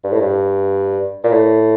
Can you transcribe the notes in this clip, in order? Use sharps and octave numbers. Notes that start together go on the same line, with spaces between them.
G2
A2
G2
A#2
A2